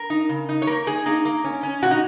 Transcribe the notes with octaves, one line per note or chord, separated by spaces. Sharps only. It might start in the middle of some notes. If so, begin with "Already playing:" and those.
Already playing: A#4
D#4
C#3
D#4
C#5
A#3 A#4
D#4 G#4
A#3 D#4
A#3
C#4
C#4
A#2 F#4
D#4